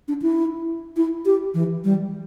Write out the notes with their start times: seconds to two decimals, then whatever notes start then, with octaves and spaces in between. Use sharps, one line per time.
0.08 D4
0.22 E4
0.97 E4
1.26 G4
1.54 E3
1.84 G3